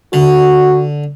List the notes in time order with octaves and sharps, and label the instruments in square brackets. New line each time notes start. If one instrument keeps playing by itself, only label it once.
[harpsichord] D3 [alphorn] F#4